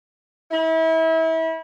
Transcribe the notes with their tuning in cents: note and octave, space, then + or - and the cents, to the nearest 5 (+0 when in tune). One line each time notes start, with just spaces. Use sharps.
E4 -30